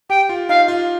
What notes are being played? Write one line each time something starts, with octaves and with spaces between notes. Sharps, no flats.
G4 G5
F4
D#4 F5
F4